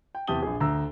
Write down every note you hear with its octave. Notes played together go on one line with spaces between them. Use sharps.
G5
E2 C3 G4 A5 D#6 G7
A#1 G#4
D2 A#5 E6